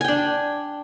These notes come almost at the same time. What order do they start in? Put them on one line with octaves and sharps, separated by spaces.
G#5 G5 D4